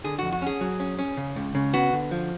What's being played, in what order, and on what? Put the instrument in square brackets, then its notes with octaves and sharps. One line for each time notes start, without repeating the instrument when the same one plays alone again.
[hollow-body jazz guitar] D3 [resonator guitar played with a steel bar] G#4
[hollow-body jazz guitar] F2 [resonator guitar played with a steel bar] F#4
[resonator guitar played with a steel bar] F#4
[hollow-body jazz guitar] C#4 [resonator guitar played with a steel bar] G#4
[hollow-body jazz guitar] F#3
C#4
C#4
C#3
C#2
C#3
[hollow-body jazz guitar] B3 [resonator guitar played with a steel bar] F#4
[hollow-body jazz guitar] D3
F3